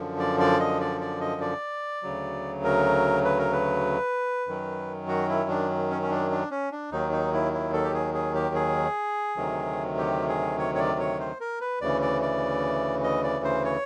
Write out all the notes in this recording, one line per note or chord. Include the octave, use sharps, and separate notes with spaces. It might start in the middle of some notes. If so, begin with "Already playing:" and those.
Already playing: F#2 D3 F3
D5
D5
D#5
D5
D5
D#5
D5
D2 C#3 F#3
A#4
B4
A#4
B4
F#2 D#3 F#3
F#4
E4
D4
C#4
C#4
D4
D4
C#4
D4
D#2 D#3 F#3 D#4
D#4
E4
E4
A4
G4
G#4
G#4
G4
G#4
D2 C3 D#3 F#3
G4
G#4
C#5
C#5
D5
C#5
C5
A#4
B4
D2 C#3 E3 D5
D5
D5
D#5
D5
C5
C#5